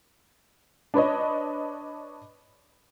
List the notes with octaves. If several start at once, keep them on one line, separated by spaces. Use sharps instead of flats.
D4 B4 C#5 D#5